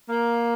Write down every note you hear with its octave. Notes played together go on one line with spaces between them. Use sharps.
A#3